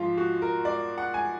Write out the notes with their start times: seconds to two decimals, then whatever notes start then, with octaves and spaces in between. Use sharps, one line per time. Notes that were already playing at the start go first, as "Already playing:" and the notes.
Already playing: G#2 F3 F4
0.18 F#4
0.42 A#4
0.65 D5
0.98 F#5
1.14 G#5